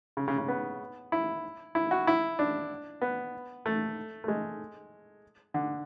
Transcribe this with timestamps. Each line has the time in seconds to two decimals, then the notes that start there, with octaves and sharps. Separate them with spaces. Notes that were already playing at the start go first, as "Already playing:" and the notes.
0.17 C#3
0.28 C#3
0.38 C#3
0.48 B3
1.12 E4
1.75 E4
1.91 F#4
2.07 E4
2.39 D4
3.01 B3
3.66 A3
4.24 A3
4.28 G#3
5.54 D3